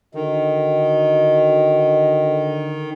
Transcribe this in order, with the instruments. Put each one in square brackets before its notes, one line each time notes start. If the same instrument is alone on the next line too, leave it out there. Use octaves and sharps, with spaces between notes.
[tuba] D3 [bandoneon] D#3 [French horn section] F#4 D#5